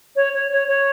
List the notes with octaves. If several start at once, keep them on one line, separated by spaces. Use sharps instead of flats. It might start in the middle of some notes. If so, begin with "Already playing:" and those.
C#5
C#5
C#5
C#5